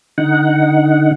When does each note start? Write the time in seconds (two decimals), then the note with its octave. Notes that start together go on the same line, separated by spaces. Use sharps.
0.18 D3 D#4 F#5